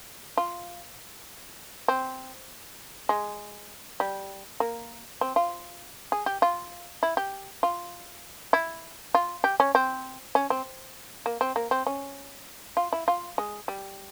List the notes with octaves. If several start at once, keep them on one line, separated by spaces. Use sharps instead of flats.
F4
C4
G#3
G3
A#3
C4
F4
G#4
G4
F4
E4
G4
F4
E4
F4
G4
C#4
C4
C#4
C4
A#3
C4
A#3
C4
C#4
F4
E4
F4
G#3
G3